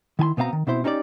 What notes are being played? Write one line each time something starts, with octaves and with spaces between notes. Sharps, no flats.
D#3 E4 G#5 C6
B2 B3 C4 F5 A#5
D#3
B2 C4 E4 C5
C#4 D#4 G4 B4 D5